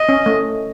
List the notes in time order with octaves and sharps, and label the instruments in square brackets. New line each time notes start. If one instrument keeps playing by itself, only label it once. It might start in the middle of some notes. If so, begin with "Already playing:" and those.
Already playing: [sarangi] D#5
[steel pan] C#4
A3